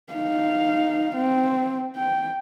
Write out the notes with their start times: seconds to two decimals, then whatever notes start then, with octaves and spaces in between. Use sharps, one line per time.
0.13 D#4 F5
1.16 C4
1.96 G5